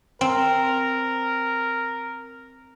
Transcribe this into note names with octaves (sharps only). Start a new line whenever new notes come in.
C4 A#4